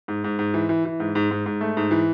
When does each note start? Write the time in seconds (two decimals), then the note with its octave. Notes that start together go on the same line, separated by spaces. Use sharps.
0.08 G#2
0.24 G#2
0.39 G#2
0.54 E3
0.69 E3
0.85 E3
1.00 G#2
1.15 G#2
1.31 G#2
1.46 G#2
1.61 A3
1.77 G#2
1.91 E3